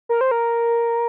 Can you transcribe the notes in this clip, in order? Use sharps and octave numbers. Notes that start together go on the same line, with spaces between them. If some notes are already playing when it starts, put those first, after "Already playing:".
A#4
C5
A#4